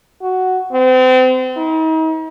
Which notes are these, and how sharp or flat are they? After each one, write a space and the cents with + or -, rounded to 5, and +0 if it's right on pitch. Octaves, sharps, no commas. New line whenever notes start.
F#4 +5
C4 -35
D#4 +40